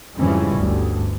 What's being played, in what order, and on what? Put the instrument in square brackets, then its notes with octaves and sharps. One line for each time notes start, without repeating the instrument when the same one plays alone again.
[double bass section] F2 G#2 C#3 E3 G3 C#4
G1 D2 G2